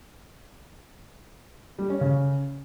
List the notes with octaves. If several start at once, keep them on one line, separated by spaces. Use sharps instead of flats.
G3
C#4
C#3